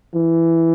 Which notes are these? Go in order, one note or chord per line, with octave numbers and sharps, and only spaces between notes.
E3